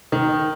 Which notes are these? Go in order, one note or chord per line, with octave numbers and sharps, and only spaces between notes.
D#3